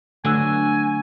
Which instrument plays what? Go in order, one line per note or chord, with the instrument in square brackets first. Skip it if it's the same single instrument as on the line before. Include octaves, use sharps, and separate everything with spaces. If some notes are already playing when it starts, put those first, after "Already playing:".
[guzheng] D3 F#3 F#4 [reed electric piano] A3 E6 [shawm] G#5